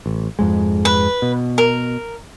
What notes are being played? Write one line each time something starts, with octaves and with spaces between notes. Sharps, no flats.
A1
F2 G#2 G#3
B4
B2
A#4